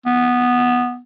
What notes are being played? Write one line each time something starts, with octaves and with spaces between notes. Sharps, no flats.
B3